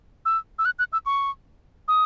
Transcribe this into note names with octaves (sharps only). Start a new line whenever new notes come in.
E6
E6
F#6
F#6
E6
C#6
D#6